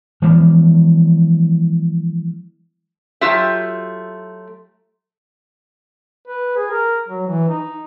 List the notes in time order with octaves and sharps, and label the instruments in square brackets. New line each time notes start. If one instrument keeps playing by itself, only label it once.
[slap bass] E3 F3 G#3 B3
[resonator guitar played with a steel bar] F#3 A3 F4 G4 E5
[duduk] B4
G#4
A#4
F#3
E3
D#4